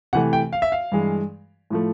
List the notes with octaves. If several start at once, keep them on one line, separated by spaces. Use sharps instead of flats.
C3 E3 A3 F#5
G5
F5
E5
F5
G2 E3 G#3
A2 F3 A3